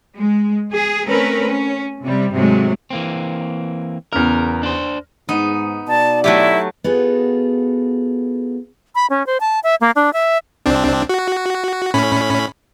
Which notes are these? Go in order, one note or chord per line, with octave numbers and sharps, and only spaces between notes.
G#3
G#4
A3 C4 C#4 A#4 B4
C#4
C3 G3
G#2 C3 F#3 G#3 A3
E3 A#3 C4
E2 C#3 A#4 F6
D4 C5
G#2 B3 D#4
B2 D5 A5
F#3 A3 E4 G4
B3 D#4 F4 F#4 G#4 A4
B5
C#4
C5
A5
E5
A#3
D4
E5
C2 C4 D4
F#4
A2 C#4 B5